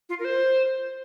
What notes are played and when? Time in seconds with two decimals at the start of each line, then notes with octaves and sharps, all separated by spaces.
0.09 F4
0.19 A#4
0.25 C5